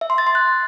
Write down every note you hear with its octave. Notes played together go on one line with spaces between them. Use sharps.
E5
C6
A6
C6
F#6